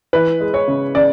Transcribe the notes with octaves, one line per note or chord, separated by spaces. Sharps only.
E3 B4
G#3
C#5
C#3
C#3 D5